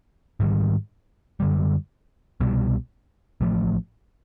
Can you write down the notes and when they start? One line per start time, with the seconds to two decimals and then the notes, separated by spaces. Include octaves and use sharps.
0.40 G#2 D#3 G3
1.40 F#2 D3 G3
2.40 C2 B2 G3
3.41 A1 A2 F3 A3